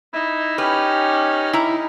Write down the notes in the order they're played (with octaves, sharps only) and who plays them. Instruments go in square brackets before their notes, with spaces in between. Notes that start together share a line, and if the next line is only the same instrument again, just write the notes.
[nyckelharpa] D#4 [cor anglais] E4
[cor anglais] C#4 [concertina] G4 F6 [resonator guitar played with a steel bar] B4
[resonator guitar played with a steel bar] E4 A#5